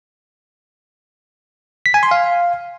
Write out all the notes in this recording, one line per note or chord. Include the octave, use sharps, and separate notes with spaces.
B6
G#5
C6
F5